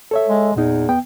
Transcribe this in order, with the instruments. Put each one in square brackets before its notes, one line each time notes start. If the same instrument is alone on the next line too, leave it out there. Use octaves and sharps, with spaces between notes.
[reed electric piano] A4 C#5 E5
[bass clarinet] G#3
[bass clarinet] E2 [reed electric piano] A#2 D#4
[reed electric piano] B3 G5